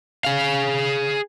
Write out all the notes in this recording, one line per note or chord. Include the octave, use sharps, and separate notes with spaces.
G#4 F5